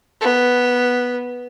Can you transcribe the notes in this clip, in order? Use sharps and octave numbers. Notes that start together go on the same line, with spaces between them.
B3